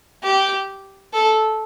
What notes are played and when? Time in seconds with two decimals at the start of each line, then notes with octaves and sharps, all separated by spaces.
0.23 G4
1.13 A4